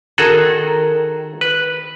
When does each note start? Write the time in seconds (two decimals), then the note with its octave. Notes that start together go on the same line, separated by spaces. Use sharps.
0.18 D#3 F#4 G#4 A4
1.41 B4